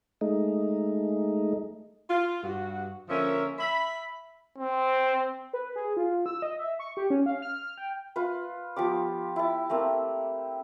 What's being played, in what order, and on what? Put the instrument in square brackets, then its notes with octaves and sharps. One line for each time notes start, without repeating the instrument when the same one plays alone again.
[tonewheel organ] G#3 A3 D#4
[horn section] F4
G2 F#4
D3 F3 A#3 C#4 A#4 E5
E5 B5
[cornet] C4
[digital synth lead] B4
G#4
F4
E6
D#5
E5
C#6
G4
C#4
F5
F6
G5
[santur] F4 B4
F3 B3 G4 D6
E4 A5
A3 A#3 C4